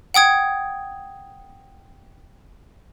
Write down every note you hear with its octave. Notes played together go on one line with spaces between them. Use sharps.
F#5 G5 D#6 G#6